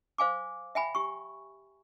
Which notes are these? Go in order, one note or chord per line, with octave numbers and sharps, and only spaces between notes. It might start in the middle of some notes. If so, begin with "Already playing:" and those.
C5 F5 G#5 D6
E5 G5 G#5 B5
G4 C#6